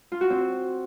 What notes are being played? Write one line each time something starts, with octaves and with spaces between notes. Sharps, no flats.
F4
F#4
C4